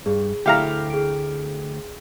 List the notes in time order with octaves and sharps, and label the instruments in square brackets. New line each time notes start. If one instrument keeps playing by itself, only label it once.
[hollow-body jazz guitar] G2 [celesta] G#4
[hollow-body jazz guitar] D2 A3 E4 [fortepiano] G4 F5 A#5
[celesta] G#4 D7